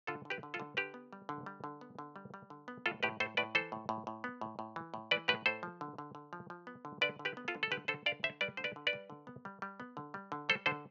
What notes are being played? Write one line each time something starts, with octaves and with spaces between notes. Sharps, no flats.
D3 F4 A4
D3
G4 B4
D3
F4 A4
D3
D3 G4 B4
B3
G3
D3
G3
D3
B3
D3
G3
G3
D3
B3
A2 F4 A4
A2 G4 B4
A2 A4 C5
A2 B4 D5
E3 A4 C5
A2
A2
A2
B3
A2
A2
E3
A2
E3 B4 D5
A2 G4 B4
A2 A4 C5
F3
D3
D3
D3
F3
F3
B3
D3
D3 B4 D5
D3
G4 B4
B3
F4 A4
D3
A4
D3 G4 B4
D3 A4 C5
D3 D5 F5
D3 C5 E5
G3 B4 D5
D3 C5
B4 D5
D3
B4 D5
G3
D3
B3
G3
G3
B3
D3
G3
D3
G3 A4 C5
D3 A4 C5